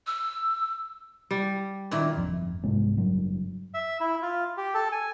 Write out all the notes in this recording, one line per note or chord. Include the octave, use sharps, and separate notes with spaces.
E6
G3
A#2 D#3 E4
G1 F2
C2 G#2 G#3 B3
F#1 G2 F#3
E5
E4
F4
G4
A4
G#5